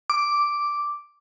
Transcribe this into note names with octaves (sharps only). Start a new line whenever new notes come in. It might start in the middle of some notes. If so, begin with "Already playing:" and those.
D6